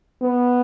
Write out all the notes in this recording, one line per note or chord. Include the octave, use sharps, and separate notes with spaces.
B3